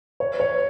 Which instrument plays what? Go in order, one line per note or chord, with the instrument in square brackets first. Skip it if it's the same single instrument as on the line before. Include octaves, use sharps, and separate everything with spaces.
[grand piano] C#5
C#5